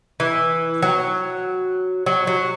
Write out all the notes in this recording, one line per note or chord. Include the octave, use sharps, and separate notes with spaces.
E3
F#3
F#3
F#3